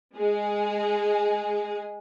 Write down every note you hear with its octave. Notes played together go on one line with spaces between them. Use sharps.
G#3 G#4